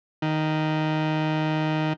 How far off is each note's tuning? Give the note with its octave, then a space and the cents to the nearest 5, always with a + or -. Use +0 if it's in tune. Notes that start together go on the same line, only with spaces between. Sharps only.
D#3 +0